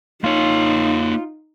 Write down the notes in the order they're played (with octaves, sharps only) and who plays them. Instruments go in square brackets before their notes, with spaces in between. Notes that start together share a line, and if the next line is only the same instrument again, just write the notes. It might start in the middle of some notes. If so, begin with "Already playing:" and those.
[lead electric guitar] A#3 C#5 [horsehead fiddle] D#4 [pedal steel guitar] F4